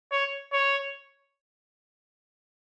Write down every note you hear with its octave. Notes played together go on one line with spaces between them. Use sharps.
C#5
C#5